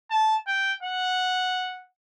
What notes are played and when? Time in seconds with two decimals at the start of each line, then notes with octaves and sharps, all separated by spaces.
0.11 A5
0.48 G5
0.83 F#5